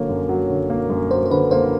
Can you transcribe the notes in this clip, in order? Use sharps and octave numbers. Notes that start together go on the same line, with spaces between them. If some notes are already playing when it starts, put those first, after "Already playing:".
Already playing: D3 F#3 A#3 C#5
F#2
F#3
D3
A#3
F#2
F#3 C5
C5
D3 B4
A#3 C5